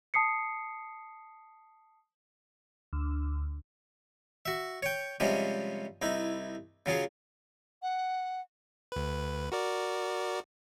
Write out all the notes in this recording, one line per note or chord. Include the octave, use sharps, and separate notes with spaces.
A5 D#6 C7 C#7
D2
F#4 E5
C#5 G5
C3 F3 G3 G#3 C#4
C2 D#4 E4
C#3 F#3 F4 G#4
F#5
D2 B4
F#4 A#4 D5